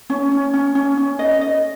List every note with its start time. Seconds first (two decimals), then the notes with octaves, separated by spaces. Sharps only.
0.10 C#4
0.32 C#4
0.54 C#4
0.75 C#4
0.97 C#4
1.19 D#5
1.41 D#5